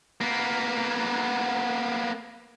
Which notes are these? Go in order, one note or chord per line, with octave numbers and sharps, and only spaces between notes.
A#3 B3